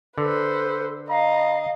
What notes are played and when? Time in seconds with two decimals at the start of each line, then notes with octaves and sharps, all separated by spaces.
0.18 D3 A4 B4 C5
1.09 D#5 F5 A#5